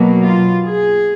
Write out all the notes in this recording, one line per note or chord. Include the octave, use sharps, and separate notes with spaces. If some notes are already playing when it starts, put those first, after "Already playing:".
Already playing: B2 F#3 A#3
F4
G#4